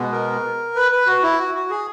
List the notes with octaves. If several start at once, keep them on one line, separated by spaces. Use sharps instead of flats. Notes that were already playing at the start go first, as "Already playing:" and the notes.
Already playing: B2 G#3 B3
A#4
B4
B4
F#4
E4
F#4
F#4
G#4